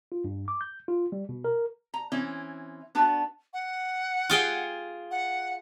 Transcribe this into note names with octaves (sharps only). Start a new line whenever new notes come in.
F4
G2
D6
G6
F4
G3
B2
A#4
A#5
E3 C4 C#4 E4
B3 D4 F#4 A5
F#5
F4 G#4 G5
F#5